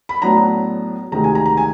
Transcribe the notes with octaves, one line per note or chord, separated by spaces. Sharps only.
B5
A2 F#3 B3 D4 A#5
D2 C3 D#3 G#3 A#5
G#5
A#5
A#5
G#5